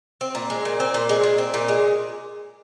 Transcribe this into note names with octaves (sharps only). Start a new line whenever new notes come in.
C4
A#2
G#3
A#2
C4
A#2
G#3
A#2
C4
A#2
G#3